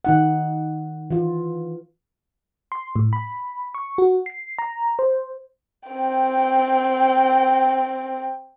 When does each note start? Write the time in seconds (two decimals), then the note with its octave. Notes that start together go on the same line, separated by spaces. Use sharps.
0.05 D#3 D#4 F#5
1.11 E3 F4
2.72 C6
2.96 A2
3.13 B5
3.74 C#6
3.98 F#4
4.26 C7
4.59 A#5
4.99 C5
5.89 C4 G5